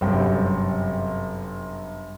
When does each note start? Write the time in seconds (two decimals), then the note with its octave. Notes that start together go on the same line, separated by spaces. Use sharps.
0.01 G1 F#2 C3 G5